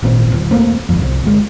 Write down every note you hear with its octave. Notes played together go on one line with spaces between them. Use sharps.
G#1 A#2 C4
D1
D#1 A3 A#3 C4
G1 F2
C2
G1 G#3